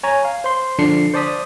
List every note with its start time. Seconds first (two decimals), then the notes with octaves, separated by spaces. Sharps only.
0.04 C#5 G#5 A#5
0.25 F5
0.44 C5 C6
0.79 D3 F3 D4 C7 C#7
1.14 C5 D5 A5 D#6 B6